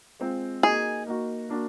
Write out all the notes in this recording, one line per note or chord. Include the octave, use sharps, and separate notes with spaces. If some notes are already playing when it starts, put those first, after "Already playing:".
G#3 C4 F4
A#3 D#4 F#4 G#4
A#3 D#4 F#4
A#3 D4 F#4